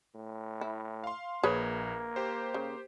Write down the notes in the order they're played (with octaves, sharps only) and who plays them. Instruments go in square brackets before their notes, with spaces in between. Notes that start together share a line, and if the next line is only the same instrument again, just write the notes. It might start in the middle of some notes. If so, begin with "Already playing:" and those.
[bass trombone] A2
[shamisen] E4
[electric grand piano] F5 C6
[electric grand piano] A#1 G#6 [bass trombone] A#3 [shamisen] G#4 B4 C#5
[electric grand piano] G4 C5
[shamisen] C#3